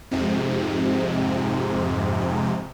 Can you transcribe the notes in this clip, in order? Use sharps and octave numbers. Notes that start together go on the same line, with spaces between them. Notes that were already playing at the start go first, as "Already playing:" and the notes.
F2 G#2 C3